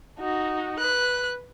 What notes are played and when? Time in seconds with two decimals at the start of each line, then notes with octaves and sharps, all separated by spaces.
0.19 D#4 F#4
0.79 B4 F#6